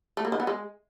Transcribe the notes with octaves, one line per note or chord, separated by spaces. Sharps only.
A3
A#3
D#3
B3
G#3